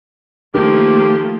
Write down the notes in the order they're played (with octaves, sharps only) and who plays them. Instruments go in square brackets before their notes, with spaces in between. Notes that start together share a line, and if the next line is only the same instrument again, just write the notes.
[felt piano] D#3 A#4 [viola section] F3 A3 A#3 [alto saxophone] G4